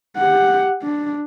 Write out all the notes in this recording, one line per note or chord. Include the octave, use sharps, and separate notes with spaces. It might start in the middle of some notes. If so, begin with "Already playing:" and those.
G4 F#5
D4